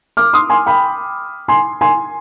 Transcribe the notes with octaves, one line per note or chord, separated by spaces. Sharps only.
D6 F6
C6 D#6
G#5 C6
G5 B5
G#5 C6
G#5 C6